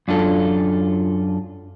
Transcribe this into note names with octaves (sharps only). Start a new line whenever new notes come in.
F#2 D4 F4 A4